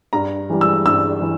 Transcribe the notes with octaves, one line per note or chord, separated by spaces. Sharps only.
G2 A#5
E3 G3
E6
G2 E6
E3